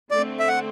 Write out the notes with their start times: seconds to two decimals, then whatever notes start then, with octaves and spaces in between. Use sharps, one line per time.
0.11 D3 A3 C4 D5
0.40 E5
0.48 F#5